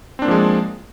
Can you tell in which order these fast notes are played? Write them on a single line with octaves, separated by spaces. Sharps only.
C4 D4 A#3 F3 G#3